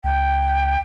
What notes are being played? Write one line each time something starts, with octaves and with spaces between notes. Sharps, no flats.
C#2 G5